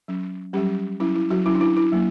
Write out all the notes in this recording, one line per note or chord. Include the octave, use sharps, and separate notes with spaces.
F#3 C#4
F#3 G3 C#4 G4
F#3 C#4 E4
E4
F#3 F#4
F#3 C#4 E4
D4
E4
E4
F#3 A#3